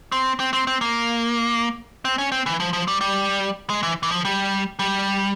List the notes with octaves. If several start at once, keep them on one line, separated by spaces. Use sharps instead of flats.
C4
C4
C4
C4
A#3
C4
C#4
C4
E3
F3
F3
G3
G3
G#3
E3
E3
F3
G3
G3